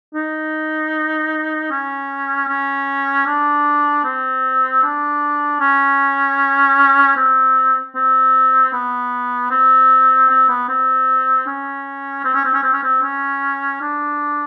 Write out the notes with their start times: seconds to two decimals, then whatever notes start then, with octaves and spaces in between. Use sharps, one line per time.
0.14 D#4
1.71 C#4
2.48 C#4
3.26 D4
4.04 C4
4.83 D4
5.60 C#4
7.17 C4
7.95 C4
8.73 B3
9.51 C4
10.29 C4
10.49 B3
10.69 C4
11.46 C#4
12.24 C4
12.34 C#4
12.44 C4
12.54 C#4
12.63 C4
12.73 C#4
12.83 C4
13.03 C#4
13.81 D4